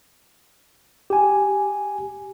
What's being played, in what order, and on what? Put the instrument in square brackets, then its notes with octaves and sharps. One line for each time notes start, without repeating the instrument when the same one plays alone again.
[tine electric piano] G4 G#5